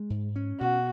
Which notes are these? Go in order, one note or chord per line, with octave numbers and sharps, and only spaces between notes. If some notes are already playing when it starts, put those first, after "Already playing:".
Already playing: G#3
G#2
C#4
B2 F#4